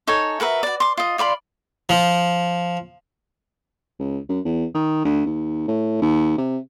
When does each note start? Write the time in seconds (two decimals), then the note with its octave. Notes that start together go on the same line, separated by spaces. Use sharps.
0.07 D#4 A4 C#5 G#5
0.40 F#4 A#4 B4 E5
0.63 F#4 D5
0.80 C6 D6
0.97 F4 D#5
1.18 F4 D5 B5 C6
1.89 F3
3.99 C#2
4.29 F#2
4.45 E2
4.74 D#3
5.05 D2
5.26 D#2
5.68 A2
6.02 D#2
6.38 C3